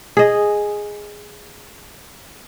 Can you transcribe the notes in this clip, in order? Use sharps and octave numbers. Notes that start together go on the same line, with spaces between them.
G#4 D#5